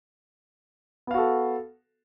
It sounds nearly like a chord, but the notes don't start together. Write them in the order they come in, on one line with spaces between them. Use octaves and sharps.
B3 F5 F#4 A4